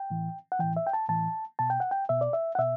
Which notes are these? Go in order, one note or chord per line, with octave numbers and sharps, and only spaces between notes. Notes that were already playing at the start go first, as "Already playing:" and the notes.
Already playing: G5
A2 E3
F#5
A2 E3 G5
E5
G5
A5
A2 E3 A5
B2 A5
G5
F#5
G5
B2 E5
D5
E5
F#5
B2 E5